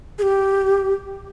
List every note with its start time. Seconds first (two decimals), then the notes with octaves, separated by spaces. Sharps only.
0.19 G#4
0.22 G4